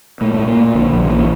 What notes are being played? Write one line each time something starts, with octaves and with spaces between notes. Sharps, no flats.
A#2 A3
A3
A#2
A#3
A#2
A#1 D3
A#1 F3
D3
A#2 E3